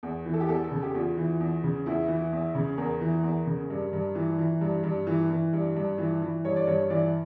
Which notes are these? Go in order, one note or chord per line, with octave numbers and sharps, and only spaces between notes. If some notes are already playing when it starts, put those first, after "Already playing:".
E2
E3
A4
G4
E2 A4
A4
C#3
G4
E2 F4
E3
E2
C#3
E2 E4
E3
E2
C#3
E2 A#4
E3
E2
C#3
G2
G2
E3
E3
G2
G2
E3
E3
G2
G2
E3
E3
G2 C#5
D5
G2 C#5
E3 D5